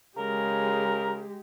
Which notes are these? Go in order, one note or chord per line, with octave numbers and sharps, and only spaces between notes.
C#3 G#3 G4 A#4